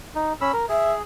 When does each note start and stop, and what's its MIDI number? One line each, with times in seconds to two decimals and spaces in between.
0.15 0.33 63
0.41 0.52 61
0.41 0.52 83
0.41 0.52 88
0.53 0.65 70
0.69 1.02 68
0.69 0.92 76